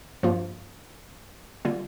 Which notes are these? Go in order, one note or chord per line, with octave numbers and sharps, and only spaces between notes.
G2 F3 A#3 F4
D3 G3 A#3 F4